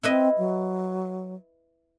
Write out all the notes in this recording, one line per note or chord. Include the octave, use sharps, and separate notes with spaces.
C4 E4 B4 D#5
F#3